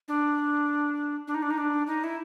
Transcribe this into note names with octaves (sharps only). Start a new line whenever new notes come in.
D4
D4
D#4
D4
D#4
D4
D#4
E4